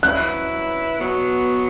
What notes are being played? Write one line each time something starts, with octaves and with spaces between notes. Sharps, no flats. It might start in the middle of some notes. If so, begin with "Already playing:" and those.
F#3 E4 B4 F#6
B2 F#3 B3